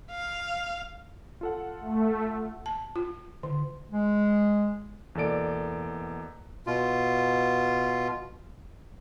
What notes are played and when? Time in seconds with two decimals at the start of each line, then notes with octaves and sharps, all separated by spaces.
0.11 F5
1.41 F4 A4 F#5
1.80 A3
2.66 A5
2.96 F4
3.43 D3
3.91 G#3
5.15 E2 B2 A#3 A4 D5 D7
6.67 B2 F4